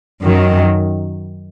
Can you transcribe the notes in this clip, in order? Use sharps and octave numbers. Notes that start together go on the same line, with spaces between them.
F#2 D#3 F#3